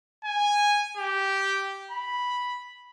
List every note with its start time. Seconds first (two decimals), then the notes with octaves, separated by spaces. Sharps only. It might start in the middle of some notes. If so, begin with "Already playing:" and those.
0.25 G#5
0.97 G4
1.91 B5